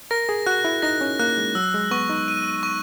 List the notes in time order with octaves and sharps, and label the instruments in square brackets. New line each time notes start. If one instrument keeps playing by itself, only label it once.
[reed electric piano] A#4 [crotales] A#6
[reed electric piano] G#4
[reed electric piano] F#4 [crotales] F#6
[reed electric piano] E4
[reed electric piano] D#4 [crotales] A#6
[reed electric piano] C#4
[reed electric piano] A#3 [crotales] F#6
[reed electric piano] G#3
[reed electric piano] F#3 [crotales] E6
[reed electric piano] G#3
[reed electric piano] B3 [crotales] C#6
[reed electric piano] D#4
[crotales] D#7
C#6